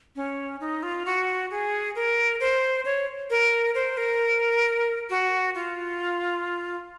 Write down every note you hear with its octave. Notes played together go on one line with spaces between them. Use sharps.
C#4
D#4
F4
F#4
G#4
A#4
C5
C#5
A#4
C5
A#4
F#4
F4